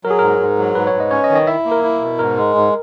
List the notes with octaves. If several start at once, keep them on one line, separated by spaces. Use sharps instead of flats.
F#3 A#4
G#4
G#2 A#4
G#2
F#3
G#2 B4
C#5
G#2
D#5
C#4 C#5
D#5
D#3
D#5
E4 E5
A#3
A#4
E4
B2
G#2 A#4
G#3
G#2